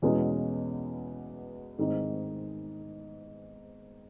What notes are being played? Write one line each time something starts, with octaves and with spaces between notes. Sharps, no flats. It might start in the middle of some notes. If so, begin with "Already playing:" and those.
E2 B2 G#3 C#4
G#2 D#3 G#3 C4 D#4